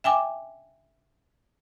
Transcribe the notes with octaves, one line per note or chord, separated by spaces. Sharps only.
E5 G5 G#5 D6